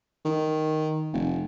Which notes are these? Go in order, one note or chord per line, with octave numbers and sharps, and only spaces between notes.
D#3
F1